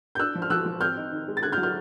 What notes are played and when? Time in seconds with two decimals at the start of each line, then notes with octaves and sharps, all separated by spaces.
0.15 G6
0.19 D4 E6 F#6
0.35 F3
0.42 F6
0.50 F3 E6 F#6
0.66 F3
0.81 C4 F6 G6
0.97 D#4
1.12 D#3
1.28 G#3
1.37 A6
1.43 D3 F#6 G#6
1.52 F6 G6
1.57 F#3
1.63 F6 G6